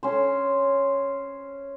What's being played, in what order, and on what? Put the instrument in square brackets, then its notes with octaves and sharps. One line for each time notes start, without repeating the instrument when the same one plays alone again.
[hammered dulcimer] C#4 C5